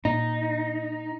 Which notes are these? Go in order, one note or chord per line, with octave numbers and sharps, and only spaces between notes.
A#2 D#4